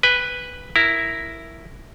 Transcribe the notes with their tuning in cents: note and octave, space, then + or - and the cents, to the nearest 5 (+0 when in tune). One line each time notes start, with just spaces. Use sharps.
B4 +0 G#5 -45
E4 +0 A#4 +0